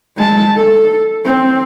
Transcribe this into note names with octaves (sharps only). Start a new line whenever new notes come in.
G#3 A5
A4
C4